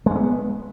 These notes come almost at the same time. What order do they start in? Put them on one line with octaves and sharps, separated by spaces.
G#3 A3 B3